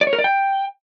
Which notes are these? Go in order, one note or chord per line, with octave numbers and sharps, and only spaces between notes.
D5
C#5
A#4
D5
G5